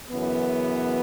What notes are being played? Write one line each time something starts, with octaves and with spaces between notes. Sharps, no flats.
F#2 C#3 E3 B3